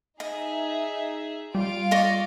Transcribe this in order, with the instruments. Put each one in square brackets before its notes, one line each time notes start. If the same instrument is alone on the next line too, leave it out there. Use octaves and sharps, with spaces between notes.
[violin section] D#4 G#4 E5 [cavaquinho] D#5
[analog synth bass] G3 [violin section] F4 F5 D7
[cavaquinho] D5 D#5 C#6